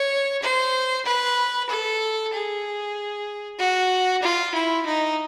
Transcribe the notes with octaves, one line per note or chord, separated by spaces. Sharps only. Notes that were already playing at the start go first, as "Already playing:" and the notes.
Already playing: C#5
C5
B4
A4
G#4
F#4
F4
E4
D#4